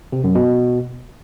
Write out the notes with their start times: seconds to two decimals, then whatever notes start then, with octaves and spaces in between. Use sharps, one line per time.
0.12 C3
0.24 F#2
0.35 B2